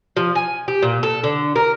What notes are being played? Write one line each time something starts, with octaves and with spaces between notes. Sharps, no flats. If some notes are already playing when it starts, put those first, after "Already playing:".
F3
G#5
G4
A#2
A4
D3
A#4